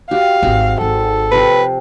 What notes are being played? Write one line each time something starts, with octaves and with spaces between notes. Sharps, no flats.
F#4 G4 F5
D#1 G#1 C4 F#4 G#4
G#1 A4
C3 F3 B4